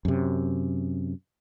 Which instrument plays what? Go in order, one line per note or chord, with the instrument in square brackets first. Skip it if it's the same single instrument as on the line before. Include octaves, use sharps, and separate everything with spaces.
[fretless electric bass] F#2 C3